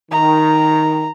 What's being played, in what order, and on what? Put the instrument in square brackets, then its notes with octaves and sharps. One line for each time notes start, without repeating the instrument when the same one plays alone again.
[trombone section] D#3 [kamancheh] A#5